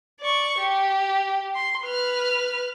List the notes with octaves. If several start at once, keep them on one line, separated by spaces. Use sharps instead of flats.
D5 C#6
G4
C6
B4 F6